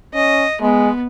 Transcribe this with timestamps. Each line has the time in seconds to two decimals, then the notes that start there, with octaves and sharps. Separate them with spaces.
0.14 C#4 D#5
0.61 G#3 B3